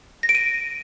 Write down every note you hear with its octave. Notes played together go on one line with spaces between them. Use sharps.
A#6
D7
D#7